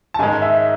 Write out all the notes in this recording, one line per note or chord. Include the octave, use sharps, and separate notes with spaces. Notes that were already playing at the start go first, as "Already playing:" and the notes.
A5
G#2 D#3 G#3 G#5
E5